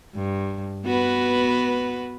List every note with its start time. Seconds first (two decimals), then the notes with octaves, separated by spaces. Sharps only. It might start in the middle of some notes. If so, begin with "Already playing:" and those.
0.15 G2
0.85 B3 F#4 B4